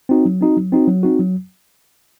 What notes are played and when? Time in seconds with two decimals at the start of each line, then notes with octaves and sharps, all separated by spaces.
0.09 C4 D#4 F#4
0.25 F#3
0.41 C4 D#4 F#4
0.57 F#3
0.72 C4 D#4 F#4
0.87 F#3
1.03 C4 D#4 F#4
1.19 F#3